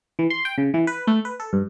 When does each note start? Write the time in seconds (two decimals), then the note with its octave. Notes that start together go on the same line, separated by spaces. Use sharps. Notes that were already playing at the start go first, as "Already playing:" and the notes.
0.19 E3
0.30 C6
0.45 G5
0.58 C#3
0.74 E3
0.87 B4
1.07 A3
1.25 B4
1.40 A4
1.53 G2